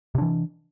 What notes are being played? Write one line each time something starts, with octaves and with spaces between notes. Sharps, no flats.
C3 E3 D4